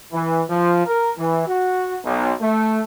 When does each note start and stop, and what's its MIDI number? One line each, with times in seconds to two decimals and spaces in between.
0.12 0.42 52
0.48 0.82 53
0.86 1.11 70
1.17 1.45 52
1.47 1.96 66
2.04 2.32 35
2.41 2.80 57